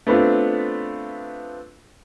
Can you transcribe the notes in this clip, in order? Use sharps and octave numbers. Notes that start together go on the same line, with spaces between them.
A3 B3 C4 D4 F4